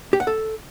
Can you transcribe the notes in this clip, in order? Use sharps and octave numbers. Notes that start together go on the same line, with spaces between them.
G4
F#5
A4